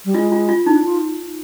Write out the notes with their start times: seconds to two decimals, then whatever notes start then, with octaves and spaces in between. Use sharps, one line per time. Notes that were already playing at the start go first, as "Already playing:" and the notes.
0.05 G3
0.14 G#3 F4
0.32 F4
0.49 F4
0.66 D4 D#4
0.85 F4